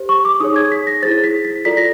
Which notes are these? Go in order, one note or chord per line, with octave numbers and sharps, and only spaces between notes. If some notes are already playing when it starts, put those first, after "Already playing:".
Already playing: G4 C5
C#6
D6
D#4 G#4 C#5 D#6
G#6
B6
A#6
E4 G#4 C5 A6
B6
B6
F4 A4 D5 B6
A#6